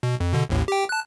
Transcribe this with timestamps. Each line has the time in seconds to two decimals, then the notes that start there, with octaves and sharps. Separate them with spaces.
0.03 B2
0.20 F2
0.33 B2 D3
0.49 A1 D#2 A2
0.68 G4 G5
0.89 A5 F#6